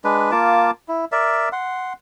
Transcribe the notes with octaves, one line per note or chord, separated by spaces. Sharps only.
G#3 D4 B4
A#3 F4 A5 D6
E4
A#4 D5 E5
F#5 C6